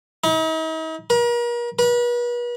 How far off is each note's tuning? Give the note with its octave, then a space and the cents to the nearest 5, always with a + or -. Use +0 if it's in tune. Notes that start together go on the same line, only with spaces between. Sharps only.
D#4 +45
A#4 +40
B4 -40